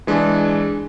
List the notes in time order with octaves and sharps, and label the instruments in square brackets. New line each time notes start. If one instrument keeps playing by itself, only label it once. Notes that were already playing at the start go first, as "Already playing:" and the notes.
[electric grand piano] E3 G#3 D4